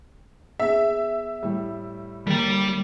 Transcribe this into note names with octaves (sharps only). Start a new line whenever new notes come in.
B3 G#4 E5
A2 G3
G1 G3 A#3 G5 B6